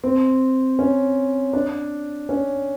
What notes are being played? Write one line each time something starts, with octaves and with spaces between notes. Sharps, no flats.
C4
C#4
D4
C#4